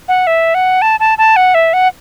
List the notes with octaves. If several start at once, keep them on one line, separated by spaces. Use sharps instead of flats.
F#5
E5
F#5
A5
A5
A5
F#5
E5
F#5